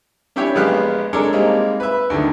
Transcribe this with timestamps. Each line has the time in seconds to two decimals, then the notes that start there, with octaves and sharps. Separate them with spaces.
0.36 C#4 D4 E4 G4 C#5 G5
0.55 A#1 G#3 B3 G4 F5 F#6
1.13 G#3 D4 A4 A#4 C#5
1.33 G3 G#3 A#3 C4 D#4
1.80 B4 E5
2.10 D2 D3 D#3